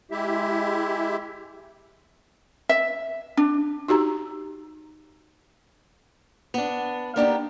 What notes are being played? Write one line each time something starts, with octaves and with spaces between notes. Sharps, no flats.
G#3 E4 G4 E5
E5
D4
D#4 F#4 G4 A#5
B3 D4
A#3 B3 D4 D#4 G4